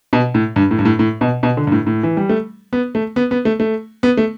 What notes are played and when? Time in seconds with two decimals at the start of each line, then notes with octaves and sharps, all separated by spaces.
0.13 B2
0.35 A2
0.56 G2
0.71 A2
0.79 G2
0.85 A2
0.99 A2
1.21 B2
1.43 B2
1.57 D3
1.67 G2
1.72 A2
1.87 A2
2.03 E3
2.17 G3
2.29 A3
2.73 B3
2.95 A3
3.16 B3
3.31 B3
3.45 A3
3.60 A3
4.03 B3
4.17 A3